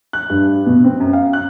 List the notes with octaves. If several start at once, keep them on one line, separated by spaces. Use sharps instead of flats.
F#6
G2
B2
C4
F#2
F5
F#6